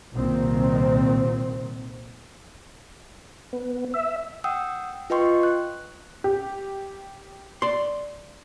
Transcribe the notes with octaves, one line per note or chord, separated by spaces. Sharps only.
C2 A#2 D#3 C4
B3
E5
F#5 G5 D#6 E6
F4 B4 D#5 G5 C6 C#6
F#6
G4
D5 C6